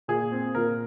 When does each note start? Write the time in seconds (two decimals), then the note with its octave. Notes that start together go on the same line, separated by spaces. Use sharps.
0.08 A#2 G#4
0.32 C4
0.55 A#2 A#4